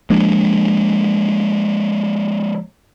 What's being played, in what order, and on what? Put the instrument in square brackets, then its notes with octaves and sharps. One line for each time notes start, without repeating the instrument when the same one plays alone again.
[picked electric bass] F3 G#3 A#3 D4